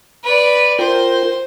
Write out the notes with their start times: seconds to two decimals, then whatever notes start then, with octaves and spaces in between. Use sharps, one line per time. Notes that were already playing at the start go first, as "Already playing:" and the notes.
0.23 B4 D5
0.79 F4 A#4 C5 G5